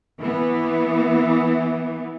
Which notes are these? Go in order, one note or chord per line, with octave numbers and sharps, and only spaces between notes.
E3 B3